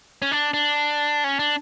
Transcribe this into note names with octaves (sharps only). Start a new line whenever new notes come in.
C#4
D4
D4
C#4
D4